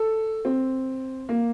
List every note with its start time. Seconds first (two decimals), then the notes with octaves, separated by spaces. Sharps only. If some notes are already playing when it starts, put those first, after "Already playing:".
Already playing: A4
0.45 C4
1.29 A#3